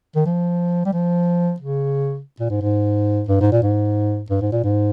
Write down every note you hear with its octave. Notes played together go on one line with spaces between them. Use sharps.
D#3
F3
G3
F3
C#3
A#2
G#2
G#2
G2
G#2
A#2
G#2
G2
G#2
A#2
G#2